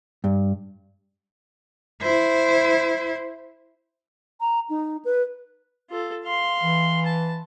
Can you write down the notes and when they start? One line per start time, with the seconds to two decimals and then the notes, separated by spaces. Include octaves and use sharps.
0.24 G2
2.02 E4 C5
4.40 A#5
4.70 D#4
5.05 B4
5.90 F4 A4
6.25 F5 C6
6.62 E3
7.06 A5